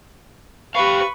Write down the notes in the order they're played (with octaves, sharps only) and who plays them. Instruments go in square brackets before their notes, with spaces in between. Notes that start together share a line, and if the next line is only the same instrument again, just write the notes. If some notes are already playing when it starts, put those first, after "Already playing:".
[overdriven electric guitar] G4 F5 [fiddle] B4 C#6